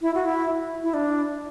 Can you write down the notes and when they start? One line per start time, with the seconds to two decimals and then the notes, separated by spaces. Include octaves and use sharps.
0.02 E4
0.14 F#4
0.25 E4
0.83 E4
0.94 D4